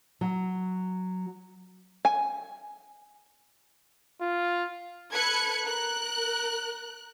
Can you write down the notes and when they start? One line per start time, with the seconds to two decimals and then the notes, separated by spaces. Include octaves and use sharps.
0.21 F#3
2.05 G#5
4.21 F4
5.13 A4 B4 F#6 G#6 C#7
5.67 A#4 F#6